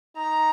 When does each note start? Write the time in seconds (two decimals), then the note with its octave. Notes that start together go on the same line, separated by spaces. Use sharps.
0.17 D#4 A#5